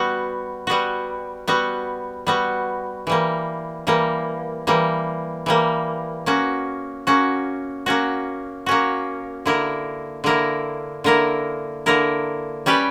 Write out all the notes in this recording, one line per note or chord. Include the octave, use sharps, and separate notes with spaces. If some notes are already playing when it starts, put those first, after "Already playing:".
Already playing: G3 B3 F#4
G3 B3 F#4
G3 B3 F#4
G3 B3 F#4
E3 G3 A#3
E3 G3 A#3
E3 G3 A#3
E3 G3 A#3
A#3 C#4 F#4
A#3 C#4 F#4
A#3 C#4 F#4
A#3 C#4 F#4
D3 A#3 E4 A#4
D3 A#3 E4 A#4
D3 A#3 E4 A#4
D3 A#3 E4 A#4
G3 C#4 G4 B4 D5